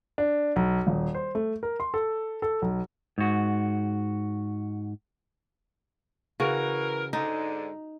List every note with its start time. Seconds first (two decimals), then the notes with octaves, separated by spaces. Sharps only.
0.18 D4
0.56 B1
0.87 D#1
1.15 C5
1.35 A3
1.63 A#4
1.80 C6
1.94 A4
2.42 A4
2.62 B1
3.18 G#2 F#4
6.40 C#3 E3 F#4 A#4
7.13 G#2 D3 D#4